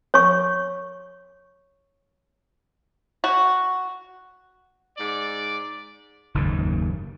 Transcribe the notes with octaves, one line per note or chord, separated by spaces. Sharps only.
C#5 C#6
F#4
G#2 D5
F#1 D#2 G#2 D#3